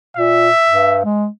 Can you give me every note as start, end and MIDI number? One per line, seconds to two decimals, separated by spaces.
0.17 0.49 46
0.17 1.03 76
0.69 1.04 43
1.05 1.26 56